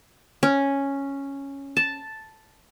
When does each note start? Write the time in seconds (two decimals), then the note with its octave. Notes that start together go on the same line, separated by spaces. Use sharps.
0.43 C#4
1.77 A5